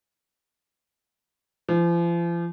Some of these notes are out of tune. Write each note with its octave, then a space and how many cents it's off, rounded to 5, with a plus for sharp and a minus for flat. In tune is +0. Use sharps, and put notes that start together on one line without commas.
F3 -40